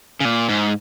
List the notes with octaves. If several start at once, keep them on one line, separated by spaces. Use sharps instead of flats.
C#3
A#2
G#2